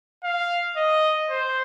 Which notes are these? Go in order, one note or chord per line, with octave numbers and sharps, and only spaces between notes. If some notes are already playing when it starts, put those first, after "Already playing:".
F5
D#5
C5